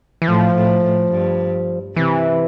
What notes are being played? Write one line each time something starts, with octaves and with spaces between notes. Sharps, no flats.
E3
A2 F3
A2
A2
G2
C3 E3